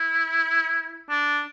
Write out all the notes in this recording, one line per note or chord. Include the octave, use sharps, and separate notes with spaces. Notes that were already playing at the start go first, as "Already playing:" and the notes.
Already playing: E4
D4